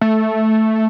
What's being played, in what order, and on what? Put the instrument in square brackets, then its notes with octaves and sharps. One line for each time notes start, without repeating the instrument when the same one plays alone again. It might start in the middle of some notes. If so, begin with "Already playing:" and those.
[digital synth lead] A3